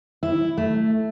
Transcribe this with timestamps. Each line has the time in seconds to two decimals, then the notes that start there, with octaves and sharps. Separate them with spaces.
0.23 E4
0.58 A3